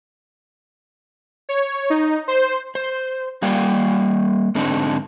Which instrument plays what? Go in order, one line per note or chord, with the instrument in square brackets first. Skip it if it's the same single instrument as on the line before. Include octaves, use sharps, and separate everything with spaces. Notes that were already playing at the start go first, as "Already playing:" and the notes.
[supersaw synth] C#5
D#4
C5
[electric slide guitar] C5
G3 A#3 D5 F5 G5
G#2 D3 C4 D4 D#4